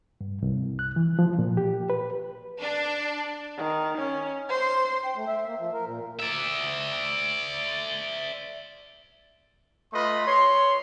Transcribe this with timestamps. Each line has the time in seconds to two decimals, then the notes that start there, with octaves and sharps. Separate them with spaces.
0.21 G2
0.42 C2
0.79 F#6
0.96 E3
1.19 F3
1.39 A#2
1.57 G4
1.90 B4
2.61 D4
3.57 D#3
3.98 C#4
4.49 C5
5.04 G5
5.16 A3
5.27 E5
5.46 A#3
5.60 F3
5.74 A#4
5.86 A#2
6.20 D5 E5
9.93 A3 F4 B4 D#5 B5 C6
10.27 C#5 C6